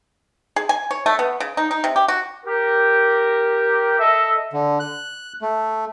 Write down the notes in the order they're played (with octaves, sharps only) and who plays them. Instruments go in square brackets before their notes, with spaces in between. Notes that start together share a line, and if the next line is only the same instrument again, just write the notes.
[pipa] G#4
G#5
C#5
A3
B3
C#3
D#4
D#4
C3
G4
F#4
[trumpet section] G4 A#4
A4 D#5 E5
[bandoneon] D3
F#6
A3